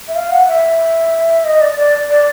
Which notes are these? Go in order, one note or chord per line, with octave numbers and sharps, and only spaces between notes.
E5
F5
F#5
E5
D#5
D5
D5
D5